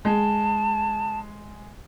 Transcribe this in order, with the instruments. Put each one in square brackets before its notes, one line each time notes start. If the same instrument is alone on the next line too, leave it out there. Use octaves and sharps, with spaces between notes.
[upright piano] G#3 [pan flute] A5